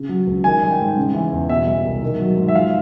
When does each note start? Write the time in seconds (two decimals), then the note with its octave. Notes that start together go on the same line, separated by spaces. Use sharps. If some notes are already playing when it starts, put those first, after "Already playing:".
Already playing: C#3
0.09 F#3
0.27 C#2
0.44 D#3 G#5
0.62 G3
0.71 G5
0.80 G#2
0.98 C#3
1.14 E3
1.33 E2
1.49 B2 E5
1.67 G3
1.85 C2
2.03 D#3
2.20 F#3
2.38 G#2
2.48 E5
2.54 F3 F5